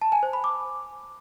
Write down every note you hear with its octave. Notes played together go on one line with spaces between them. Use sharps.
A5
G#5
C5
B5
D6